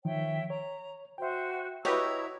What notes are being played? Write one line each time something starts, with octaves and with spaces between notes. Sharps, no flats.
D#3 F3 C#5 E5 G5
C#5 A#5
F#4 C5 E5 G5
E4 F#4 G4 B4 C#5 D#5 A#5 E6